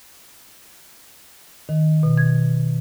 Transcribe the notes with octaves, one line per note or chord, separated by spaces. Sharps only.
D#3
B2
G#6